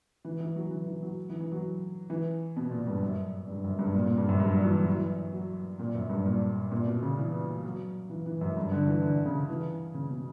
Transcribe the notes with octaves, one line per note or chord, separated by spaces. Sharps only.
E3
E3
F#3
E3
E3
F#3
E3
E3
F#3
E3
B2
A#2
G2
F#2
G2
F#2
G2
A#2
A#2
G2
F#2
G2
F#3
E3
E3
F#3
E3
F#3
A#2
F#2
G2
A#2
A#2
B2
C#3
E3
F#3
E3
E3
F#2
G2
D3
E3
D3
C#3
E3
C#3
B2